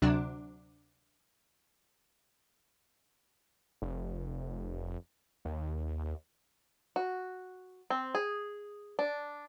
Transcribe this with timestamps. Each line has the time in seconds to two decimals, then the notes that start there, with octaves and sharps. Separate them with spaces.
0.02 D2 C3 F#3 D4
3.82 F1
5.45 D#2
6.96 F#4
7.90 C4
8.15 G#4
8.99 D4